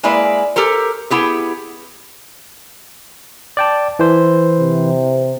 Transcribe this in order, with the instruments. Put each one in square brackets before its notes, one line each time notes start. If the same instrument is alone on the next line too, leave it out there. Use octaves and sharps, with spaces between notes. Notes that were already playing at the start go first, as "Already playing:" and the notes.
[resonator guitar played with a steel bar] G#3 A#3 E4 B4 D5
G4 A4 A#4 C5
B3 E4 G4 G#4
[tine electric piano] D5 G5 A5
E3 C5
[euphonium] C3